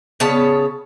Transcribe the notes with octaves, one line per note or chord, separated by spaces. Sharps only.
C#3 B3 C#5 A5